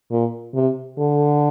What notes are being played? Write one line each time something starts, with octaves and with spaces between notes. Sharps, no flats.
A#2
C3
D3